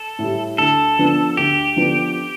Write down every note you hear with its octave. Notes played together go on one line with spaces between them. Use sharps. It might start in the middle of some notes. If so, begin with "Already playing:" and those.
Already playing: A4
A2 G3
D2 A4
D3 F3 B3 D4
D2 G4
D3 F3 B3 D4